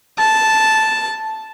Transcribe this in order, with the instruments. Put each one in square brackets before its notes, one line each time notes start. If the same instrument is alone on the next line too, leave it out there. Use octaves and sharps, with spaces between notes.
[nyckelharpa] A5